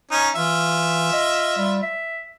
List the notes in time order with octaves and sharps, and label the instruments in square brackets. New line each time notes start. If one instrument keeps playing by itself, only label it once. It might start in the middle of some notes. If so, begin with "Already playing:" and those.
[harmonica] C#4 D#4
[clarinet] E3 [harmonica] F4 E5
[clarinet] D#5
G3
E5